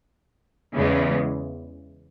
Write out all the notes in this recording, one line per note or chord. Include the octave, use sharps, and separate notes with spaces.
E2 C#3 E3 G#3